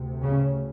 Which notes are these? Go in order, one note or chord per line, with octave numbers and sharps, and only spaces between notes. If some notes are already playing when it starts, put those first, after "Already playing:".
Already playing: D2 C3
C#3 C#4